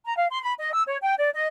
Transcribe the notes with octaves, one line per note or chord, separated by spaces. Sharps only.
A#5
F5
C6
B5
D#5
E6
C#5
G5
D5
D#5